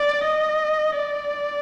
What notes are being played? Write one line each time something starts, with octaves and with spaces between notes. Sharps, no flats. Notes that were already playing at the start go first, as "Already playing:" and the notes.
Already playing: D5
D#5
D5